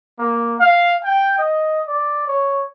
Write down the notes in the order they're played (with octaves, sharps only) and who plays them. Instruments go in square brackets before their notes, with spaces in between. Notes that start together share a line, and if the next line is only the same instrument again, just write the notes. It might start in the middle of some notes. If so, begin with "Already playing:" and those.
[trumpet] A#3
F5
G5
D#5
D5
C#5